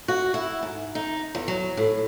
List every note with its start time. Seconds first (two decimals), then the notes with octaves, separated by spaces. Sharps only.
0.08 F#4
0.34 E4
0.63 G#2
0.95 D#4
1.35 E2
1.48 F#3
1.77 A2